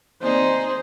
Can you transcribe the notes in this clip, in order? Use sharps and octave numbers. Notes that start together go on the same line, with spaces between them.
A#3 C4 D#4 G#4 C5 D5